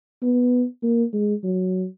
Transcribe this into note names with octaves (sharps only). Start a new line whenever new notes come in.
B3
A#3
G#3
F#3